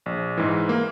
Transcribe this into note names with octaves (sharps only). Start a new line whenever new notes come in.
A#1
G#2 E3
A#3